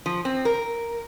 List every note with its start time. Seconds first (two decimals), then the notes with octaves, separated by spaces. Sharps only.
0.06 F3
0.25 C4
0.45 A#4